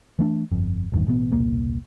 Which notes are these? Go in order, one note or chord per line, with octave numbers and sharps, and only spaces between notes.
E3 A3 D4
G1 F2
A1 E2 G2 D#3
A1 B2 E3 B3
E1 C2 A#2 A#3